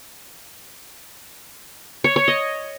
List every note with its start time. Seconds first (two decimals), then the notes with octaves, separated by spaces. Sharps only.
2.04 C#5
2.16 C#5
2.28 D#5